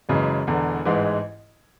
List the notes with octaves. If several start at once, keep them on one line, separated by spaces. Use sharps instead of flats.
F#1 F#2 C#3 E3 G#3
E1 E2 D3
A1 G#2 E3 G#3